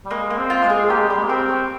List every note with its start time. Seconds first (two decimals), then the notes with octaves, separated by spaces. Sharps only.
0.05 G3
0.11 G#3 A#3
0.30 A#3
0.37 C4
0.50 F4
0.63 G#3
0.70 G#4
0.90 A#3 G4
0.99 G#3
1.08 G3 G4
1.17 G#3
1.24 A#3
1.29 C4 A#4
1.49 C#5